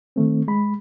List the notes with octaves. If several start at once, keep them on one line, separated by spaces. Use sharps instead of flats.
D#3 A3 C4
G#3 B5